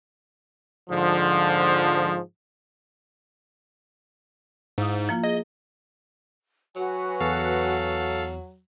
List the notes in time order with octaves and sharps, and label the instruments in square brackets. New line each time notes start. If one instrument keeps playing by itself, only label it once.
[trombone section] G#2 D3 F3
[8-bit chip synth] G#2 [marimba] E4 F5 D#6
[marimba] F3 A#3 F4
[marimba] G#4 [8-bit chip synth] D#5
[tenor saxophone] F#3 [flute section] F#4 B4 G#5
[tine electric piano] E2 [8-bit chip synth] A4 F5